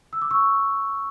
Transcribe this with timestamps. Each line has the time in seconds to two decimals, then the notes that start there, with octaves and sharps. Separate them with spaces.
0.13 E6
0.22 D6
0.31 C#6 E6